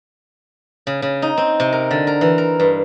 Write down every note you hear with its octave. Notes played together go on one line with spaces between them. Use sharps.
C#3
C#3
D#4
C4
C3
A#4
D3
A#4
E3
A#4
G2